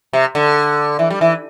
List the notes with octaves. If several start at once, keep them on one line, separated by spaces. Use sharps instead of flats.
C3
D3
E3
G3
E3